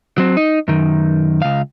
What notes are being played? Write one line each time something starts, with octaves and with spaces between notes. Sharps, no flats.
F#3 C4
D#4
F#2 D#3
C#2 F5